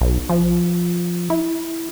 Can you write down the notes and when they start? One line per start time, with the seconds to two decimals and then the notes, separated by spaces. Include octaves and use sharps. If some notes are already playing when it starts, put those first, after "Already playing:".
0.01 B1
0.29 F3
1.30 E4